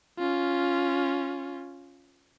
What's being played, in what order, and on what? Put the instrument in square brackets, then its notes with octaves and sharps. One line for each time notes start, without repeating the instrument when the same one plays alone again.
[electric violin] C#4 F4